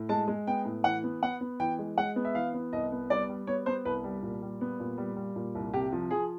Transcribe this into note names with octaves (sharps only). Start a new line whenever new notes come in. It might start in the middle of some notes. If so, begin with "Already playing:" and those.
Already playing: A2
G#3 A5
G#3
B3 G5
A2
E3 F#5
B3
B3 F#5
B3
E3 G5
G#3
G#3 F#5
B3
E5
E3 F5
B3
C2 D#5
B3
G3 D5
G3
B3 C#5
B3 C5
C2 B4
G3
A#2
G3
B3
A#2
G3
G3
A#2
C2
C3 G4
F3
F3 G#4